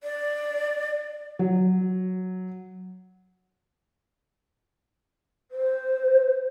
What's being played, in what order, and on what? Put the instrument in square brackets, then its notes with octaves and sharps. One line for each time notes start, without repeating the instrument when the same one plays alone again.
[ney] D5
[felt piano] F#3
[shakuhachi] C5